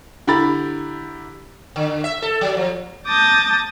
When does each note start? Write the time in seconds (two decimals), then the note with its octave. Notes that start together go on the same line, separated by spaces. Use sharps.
0.27 D3 E4 G4 A#5 B5 A6
1.76 D3
2.04 E5
2.22 A4
2.41 F#3
2.57 F3
3.06 A5 D6 D#6 G6 A6 A#6